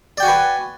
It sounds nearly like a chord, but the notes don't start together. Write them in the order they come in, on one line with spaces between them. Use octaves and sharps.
D5 G5 F#4 G#5 B4